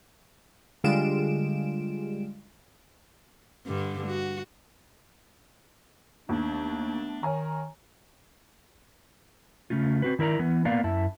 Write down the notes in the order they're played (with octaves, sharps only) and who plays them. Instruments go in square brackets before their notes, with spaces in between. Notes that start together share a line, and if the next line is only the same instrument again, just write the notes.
[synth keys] D3 G3 G#3 F4 D7 E7
[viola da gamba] G2 D3 G3
F#4
[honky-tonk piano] D#2 [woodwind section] A3 B3 D4
[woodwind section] D#3 [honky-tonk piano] C#5 G#5 A#5
[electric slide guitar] C#3 A3 C#4 F4
C4 F#4 B4
D#3 E4 A#4 D5 A#5
E3 B3
A#3 B3 D5 F5
F#2 E4 E5 A5